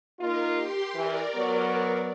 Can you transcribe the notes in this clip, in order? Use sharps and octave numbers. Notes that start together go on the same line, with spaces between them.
A#3 D#4 F4 A#4
G4 C6
E3 A#4 D5
F#3 B3